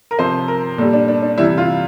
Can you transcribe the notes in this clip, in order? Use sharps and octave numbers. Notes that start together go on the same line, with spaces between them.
A#4
C3 F3 C5
A#4
A#2 G3 A4
D4
D4
D4
C3 E3 G3 E4
F4